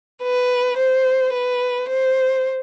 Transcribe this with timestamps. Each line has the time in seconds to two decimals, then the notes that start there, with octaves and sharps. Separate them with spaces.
0.23 B4
0.78 C5
1.34 B4
1.90 C5